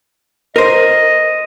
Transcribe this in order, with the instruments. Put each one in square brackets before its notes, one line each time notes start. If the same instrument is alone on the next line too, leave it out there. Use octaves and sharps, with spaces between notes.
[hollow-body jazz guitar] A#4 C5 [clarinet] D#5